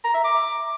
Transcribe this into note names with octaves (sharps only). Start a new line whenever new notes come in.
A#5
E5
D6